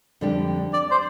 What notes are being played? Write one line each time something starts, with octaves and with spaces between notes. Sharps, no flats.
F2 D3 G3 D4 G4
D5
C5